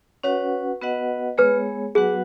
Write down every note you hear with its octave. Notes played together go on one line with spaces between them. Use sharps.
C#4 F#4 B4 C#5 F#5
B3 F#4 B4 D#5 F#5
G#3 B3 G#4 B4 C#5
F#3 B3 F#4 G#4 B4 F#5